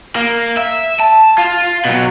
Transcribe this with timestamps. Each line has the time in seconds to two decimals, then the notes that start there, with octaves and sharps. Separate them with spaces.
0.16 A#3
0.57 E5
1.00 A5
1.38 F4
1.85 B2 F#3